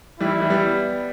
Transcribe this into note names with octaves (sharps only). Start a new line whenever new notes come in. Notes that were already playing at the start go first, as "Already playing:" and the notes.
E3 G3 E4
E3 G3
G3 B3